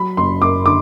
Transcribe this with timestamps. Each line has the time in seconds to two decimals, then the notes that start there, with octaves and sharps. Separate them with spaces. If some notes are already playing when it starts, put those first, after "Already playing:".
Already playing: F#3 B5
0.17 F#1 C6
0.42 F#2 D6
0.65 D3 D6